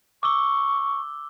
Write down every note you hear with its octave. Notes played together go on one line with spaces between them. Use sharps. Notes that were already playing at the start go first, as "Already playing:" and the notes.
C#6 D6 E6 G7